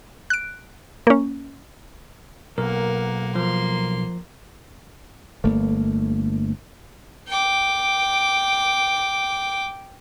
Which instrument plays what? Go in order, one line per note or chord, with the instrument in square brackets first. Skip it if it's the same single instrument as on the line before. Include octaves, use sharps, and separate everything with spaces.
[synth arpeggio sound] F#6 D7
A#3 C#4
[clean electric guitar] B1 [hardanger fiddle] A#3 F#5 [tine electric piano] A#4
[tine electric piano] F3 [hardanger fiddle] A#3 C6
[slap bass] G1 A3 A#3
[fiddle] G5 D6